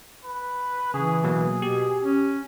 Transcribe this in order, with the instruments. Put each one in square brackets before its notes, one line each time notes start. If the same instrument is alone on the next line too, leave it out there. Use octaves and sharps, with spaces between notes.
[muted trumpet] B4
[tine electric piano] C#3 [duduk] E3 [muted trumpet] G#4
[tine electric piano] B2 F#3 A#3 [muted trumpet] G#4
[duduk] B2 [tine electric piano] G4
[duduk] C#4